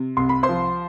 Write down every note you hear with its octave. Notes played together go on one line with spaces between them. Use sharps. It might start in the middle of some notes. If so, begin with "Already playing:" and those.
Already playing: C3
C2 C6
B5
C5 C6
F3